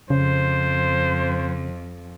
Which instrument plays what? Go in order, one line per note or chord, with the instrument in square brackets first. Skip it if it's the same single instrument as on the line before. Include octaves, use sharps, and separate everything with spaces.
[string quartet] F2 [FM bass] C#3 [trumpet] C5